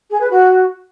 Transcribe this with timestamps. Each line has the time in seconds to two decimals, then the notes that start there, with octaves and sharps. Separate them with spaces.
0.10 G#4
0.20 B4
0.30 F#4